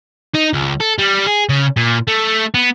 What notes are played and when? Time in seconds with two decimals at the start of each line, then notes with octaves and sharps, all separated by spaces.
0.35 D#4
0.54 C#2
0.81 A4
0.99 G3
1.27 G#4
1.49 C#3
1.77 A#2
2.08 A3
2.54 B3